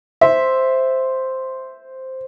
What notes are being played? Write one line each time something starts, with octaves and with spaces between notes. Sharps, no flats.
C5 E5